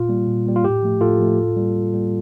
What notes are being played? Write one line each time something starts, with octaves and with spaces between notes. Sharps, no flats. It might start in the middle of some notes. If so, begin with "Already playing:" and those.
Already playing: A#2 F4
G3 A#3
A#2
G3 A#3
F4
A2 G4
F3 A3
A2 F4 A4
F3 A3
A2
G3 A#3
A2
G3 A#3